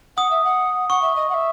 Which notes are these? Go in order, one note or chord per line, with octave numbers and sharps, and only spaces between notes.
F#5 D#6
E5
F#5
F#5 C#6
E5
D#5
F#5
E5